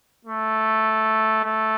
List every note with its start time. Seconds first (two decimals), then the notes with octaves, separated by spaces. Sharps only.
0.25 A3
1.44 A3